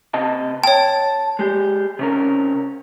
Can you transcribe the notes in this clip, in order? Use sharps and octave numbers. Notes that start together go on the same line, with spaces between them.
C3 D#5 A5
C#5 G5 A5
G#3 G4
C3 C#4 A#4